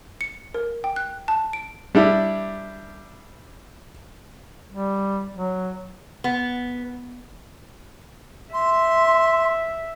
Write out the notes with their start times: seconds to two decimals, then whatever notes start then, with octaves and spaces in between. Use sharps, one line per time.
0.21 C#7
0.54 A#4
0.84 G5
0.96 F#6
1.28 A5
1.53 D7
1.95 G3 D4 E4
4.72 G3
5.33 F#3
6.24 B3
8.53 E5 C6